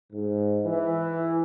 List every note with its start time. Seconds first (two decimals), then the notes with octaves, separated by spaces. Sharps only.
0.13 G#2
0.66 E3